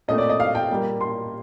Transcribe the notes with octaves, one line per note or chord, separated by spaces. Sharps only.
A#2 A3 C4 D#5
D5
D#5
F5
G5
A#2 G3 A#3
C6